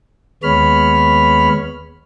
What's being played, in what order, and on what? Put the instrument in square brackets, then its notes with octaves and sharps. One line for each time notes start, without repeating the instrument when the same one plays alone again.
[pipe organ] D#2 G#3 B3 C#5 B5 F6